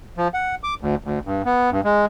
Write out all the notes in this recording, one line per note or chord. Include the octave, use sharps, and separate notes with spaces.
F3
F#5
D6
D2
D2
G2
B3
G2
G#3